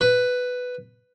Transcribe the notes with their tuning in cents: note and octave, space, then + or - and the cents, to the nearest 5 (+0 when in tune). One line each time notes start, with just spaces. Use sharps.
B4 +5